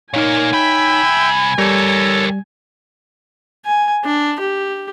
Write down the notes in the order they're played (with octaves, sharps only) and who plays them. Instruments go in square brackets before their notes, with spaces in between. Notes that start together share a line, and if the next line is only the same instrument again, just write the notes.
[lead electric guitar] A#2 A#3 [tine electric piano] D#4 C#5 [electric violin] G#5
[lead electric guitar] C2 B5 [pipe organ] E5 G5
[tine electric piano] G3 [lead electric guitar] G4 A#4 [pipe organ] A4 C#5
[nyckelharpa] G#5
D4
G4